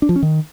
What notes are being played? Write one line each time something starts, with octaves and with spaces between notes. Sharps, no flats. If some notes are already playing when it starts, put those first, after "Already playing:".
D4
F3
C#4
D#3